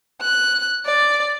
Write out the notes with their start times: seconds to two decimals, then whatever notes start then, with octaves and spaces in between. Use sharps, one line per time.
0.22 F#6
0.86 D5